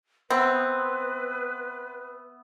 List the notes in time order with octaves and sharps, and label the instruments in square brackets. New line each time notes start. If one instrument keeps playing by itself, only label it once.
[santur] B3 E5 B5 [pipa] C4 [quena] B4